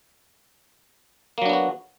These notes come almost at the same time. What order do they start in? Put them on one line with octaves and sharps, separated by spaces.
A#3 F#3 D4 B3 F#4